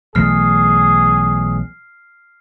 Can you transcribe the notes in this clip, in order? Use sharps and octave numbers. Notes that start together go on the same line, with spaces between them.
B1 E3 A3 G#4 F6 C7